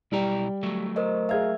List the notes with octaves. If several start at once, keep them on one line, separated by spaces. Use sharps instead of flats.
B1 G3 E4 G5 A#5
F#3 A3
A#4 C5 D#5
G#4 A#4 E5 F5 G#6